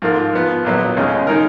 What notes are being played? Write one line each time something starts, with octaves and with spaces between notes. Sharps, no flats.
G#2 F3 A#3 F4 A#4
F3 B3 F4
A#1 A#2 F#3 B3
D#2 C#3 G#3 C#4
D#3 G#3 D#4 A#4